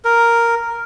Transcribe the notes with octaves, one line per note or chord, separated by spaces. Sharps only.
A#4